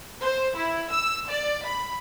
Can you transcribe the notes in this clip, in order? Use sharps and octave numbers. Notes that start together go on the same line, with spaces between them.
C5
E4
E6
D5
B5